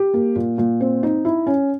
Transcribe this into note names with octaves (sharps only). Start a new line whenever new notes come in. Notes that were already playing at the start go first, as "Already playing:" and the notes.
Already playing: G4
A#3
A#2
A#2
C4
D#4
E4
C#4